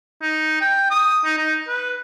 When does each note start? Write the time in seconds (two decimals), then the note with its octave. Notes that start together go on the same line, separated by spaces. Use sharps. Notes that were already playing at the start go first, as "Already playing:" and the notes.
0.22 D#4
0.61 G5
0.91 D#6
1.25 D#4
1.38 D#4
1.68 B4